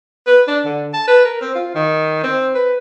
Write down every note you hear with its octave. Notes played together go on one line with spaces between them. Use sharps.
B4
D4
D3
A5
B4
A#4
C4
F4
D#3
C4
B4